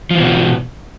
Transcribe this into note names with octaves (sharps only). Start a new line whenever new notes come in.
B2 E3 F3